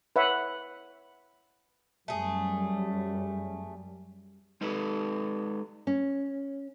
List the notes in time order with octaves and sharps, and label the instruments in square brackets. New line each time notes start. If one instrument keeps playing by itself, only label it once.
[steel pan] B4 C#5 E5 F#5
[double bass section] F#2 G3 [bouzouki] A3 G#4
[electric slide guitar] G#3 D#4 A4 B4
[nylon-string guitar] C#4